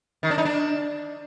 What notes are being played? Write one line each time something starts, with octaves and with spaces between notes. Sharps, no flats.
D#3
D4
D#4
D4